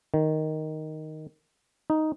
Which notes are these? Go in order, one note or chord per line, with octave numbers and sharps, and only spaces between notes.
D#3
D#4